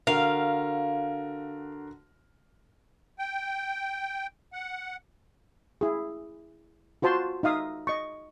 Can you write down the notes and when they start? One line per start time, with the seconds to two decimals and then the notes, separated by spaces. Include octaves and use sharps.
0.07 D3 F#4 A#4 F5
3.19 G5
4.53 F#5
5.81 E4 G#4
7.02 F4 F#4 C5 A5 C6
7.43 D#4 E5 F5 D#6
7.87 D#5 C#6